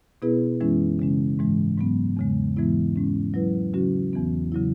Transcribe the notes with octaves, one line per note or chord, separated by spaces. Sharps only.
B2 B3 E4 G#4 B4
F#2 E3 G#3 C#4 E4
C#3 G#3 C#4
G#2 E3 G#3
G#2 F#3 B3
E2 C#3 G#3
G#2 E3 G#3 B3 E4
G#2 G#3 C#4
F#3 E4 B4
C#3 F#3 C#4 F#4
E2 E3 B3
C#3 F#3 E4